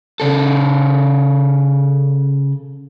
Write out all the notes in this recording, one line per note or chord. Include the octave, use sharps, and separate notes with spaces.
C#3 A4